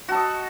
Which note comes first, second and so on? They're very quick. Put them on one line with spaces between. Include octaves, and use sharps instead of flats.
F#4 A4 D#5